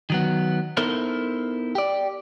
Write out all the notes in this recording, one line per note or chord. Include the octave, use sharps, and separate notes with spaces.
D#3 F#3 B3
B3 D#4 E4 A4 A#4 C5
G4 D5